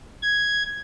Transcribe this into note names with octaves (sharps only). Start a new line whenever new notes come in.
G#6